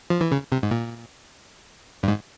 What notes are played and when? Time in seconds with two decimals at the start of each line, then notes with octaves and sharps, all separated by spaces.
0.10 F3
0.21 E3
0.32 C#3
0.52 C3
0.63 G#2
0.71 A#2
2.03 G2
2.08 G#2